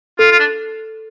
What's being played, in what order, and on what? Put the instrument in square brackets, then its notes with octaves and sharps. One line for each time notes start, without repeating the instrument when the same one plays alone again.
[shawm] F4 [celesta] A4
[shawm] F4
D4